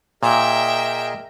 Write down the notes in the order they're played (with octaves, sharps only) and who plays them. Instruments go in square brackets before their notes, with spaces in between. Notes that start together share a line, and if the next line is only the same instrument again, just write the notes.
[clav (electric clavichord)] A#2 [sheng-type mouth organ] G#4 A#4 D#5 [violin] E5 G5